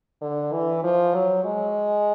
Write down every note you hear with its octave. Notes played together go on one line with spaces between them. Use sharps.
D3
E3
F3
F#3
G#3